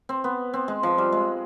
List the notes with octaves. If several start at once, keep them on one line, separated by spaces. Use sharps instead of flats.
C4
B3
C4
G#3
F3
G3
G#3